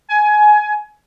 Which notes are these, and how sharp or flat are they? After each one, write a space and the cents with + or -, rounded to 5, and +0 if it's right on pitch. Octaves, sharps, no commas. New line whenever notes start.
G#5 +20